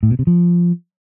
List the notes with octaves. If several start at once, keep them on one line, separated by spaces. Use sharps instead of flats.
A2
B2
C3
F3